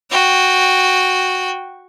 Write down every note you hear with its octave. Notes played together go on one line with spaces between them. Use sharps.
F#4 G5